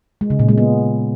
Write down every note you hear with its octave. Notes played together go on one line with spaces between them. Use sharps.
G#3
C#3
A#2
G#3
B3